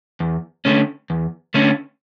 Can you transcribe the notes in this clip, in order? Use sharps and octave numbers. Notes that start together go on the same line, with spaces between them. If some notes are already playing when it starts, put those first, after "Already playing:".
E2
D3 A3 C#4
E2
D3 A3 C#4